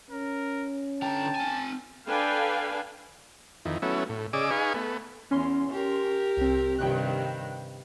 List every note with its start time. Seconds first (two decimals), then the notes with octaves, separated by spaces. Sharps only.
0.11 C#4 A#4
1.02 D3 G5 A5 A#5
1.35 C4 G#5
2.07 D4 A4 B4 F5 G5 G#5
3.65 F2 D#3 E3
3.82 F#3 A3 B3 C#4 E4
4.09 A2
4.33 C#3 G#4 D5 D#5 D6 E6
4.51 D#4 G#4 B4 F5 G#5 C#6
4.74 A3 B3
5.31 E2 C#4 C6
5.72 G4 A#4
6.37 C2 C4
6.78 G2 C3 D#3 G5 F#6